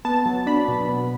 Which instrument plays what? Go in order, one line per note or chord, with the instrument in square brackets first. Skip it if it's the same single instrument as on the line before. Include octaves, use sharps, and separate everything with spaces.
[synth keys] B3 A5
F#3
D4 B5
B2
B3